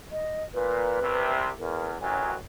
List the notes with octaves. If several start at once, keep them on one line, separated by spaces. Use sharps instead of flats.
D#5
A#2 B4
C2 C3
E2 A#4
A1 F#2 F#3 G#5